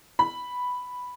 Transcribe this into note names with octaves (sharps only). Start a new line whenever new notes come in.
B5